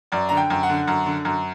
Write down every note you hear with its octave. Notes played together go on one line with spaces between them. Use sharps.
F#2 D5
D3 A#5
G5
F#2
F#5
D3
F#2
D3
F#2